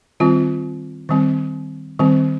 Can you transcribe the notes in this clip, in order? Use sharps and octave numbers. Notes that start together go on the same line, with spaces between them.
D#3 G3 C4 F4
D#3 G3 C4
D#3 G3 C4